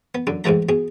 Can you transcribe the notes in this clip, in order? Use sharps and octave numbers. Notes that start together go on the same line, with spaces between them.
B3
F#2 D3
A1 G#2 E3 A3 A#5
B2 G#4